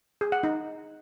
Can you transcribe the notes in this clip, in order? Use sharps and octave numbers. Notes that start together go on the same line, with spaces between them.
G#4
F#5
D#4